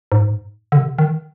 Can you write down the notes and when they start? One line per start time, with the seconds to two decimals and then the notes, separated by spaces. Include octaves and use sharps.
0.12 G#2
0.72 D3
0.77 C3
0.99 D#3